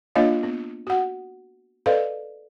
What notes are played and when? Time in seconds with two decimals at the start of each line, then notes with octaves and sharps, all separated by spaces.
0.15 A#3 D4 F4 C#5 D#5 F5
0.43 B3
0.87 F#4 F#5
1.86 A4 B4 D5 D#5 F5